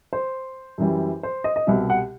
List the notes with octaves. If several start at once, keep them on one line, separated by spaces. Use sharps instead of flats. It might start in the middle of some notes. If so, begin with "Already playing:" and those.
C5
F#2 E3 G3
C5
D#5
D#5
C2 B2 G3 E5
F#5